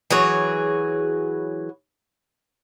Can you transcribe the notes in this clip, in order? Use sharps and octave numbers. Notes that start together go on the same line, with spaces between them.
E3 F#3 G#4 C#5